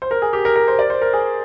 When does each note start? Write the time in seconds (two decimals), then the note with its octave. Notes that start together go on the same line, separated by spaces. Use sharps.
0.02 C5
0.11 A#4
0.22 G#4
0.33 G4
0.45 A#4
0.56 A#4
0.68 C5
0.79 D5
0.90 C5
1.02 A#4
1.13 G#4